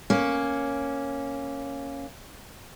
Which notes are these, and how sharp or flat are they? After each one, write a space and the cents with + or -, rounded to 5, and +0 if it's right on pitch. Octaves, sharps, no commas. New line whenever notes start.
A#3 +0 C#4 -5